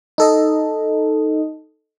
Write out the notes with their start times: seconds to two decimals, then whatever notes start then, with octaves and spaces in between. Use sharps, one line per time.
0.18 D#4 A4 D#5